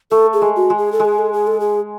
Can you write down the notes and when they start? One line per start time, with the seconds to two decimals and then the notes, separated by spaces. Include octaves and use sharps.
0.11 A3 A4
0.33 G#4
0.42 G#3
0.56 F#4
0.70 G#3
0.78 G#4
0.92 A4
1.00 G#3
1.05 G#4
1.19 A4
1.33 G#4
1.47 A4
1.60 G#4